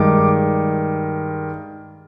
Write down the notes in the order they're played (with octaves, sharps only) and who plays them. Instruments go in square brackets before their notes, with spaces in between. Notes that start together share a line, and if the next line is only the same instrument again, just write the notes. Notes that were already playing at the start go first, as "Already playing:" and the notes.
Already playing: [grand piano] G2 D#3 G#3 D6